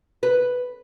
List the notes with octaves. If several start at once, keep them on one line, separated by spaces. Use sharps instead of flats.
B4